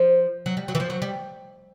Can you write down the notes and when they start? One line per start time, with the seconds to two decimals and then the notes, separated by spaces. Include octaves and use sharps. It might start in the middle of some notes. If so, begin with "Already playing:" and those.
Already playing: F3
0.46 F#3
0.57 G3
0.68 F#3
0.75 E3
0.80 F3
0.90 F#3
1.02 G3